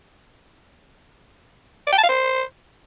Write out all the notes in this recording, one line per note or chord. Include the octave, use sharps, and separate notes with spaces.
D5
G5
A5
F5
C5